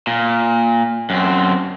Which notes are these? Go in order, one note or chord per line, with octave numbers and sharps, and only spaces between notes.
A#2
F#2 C4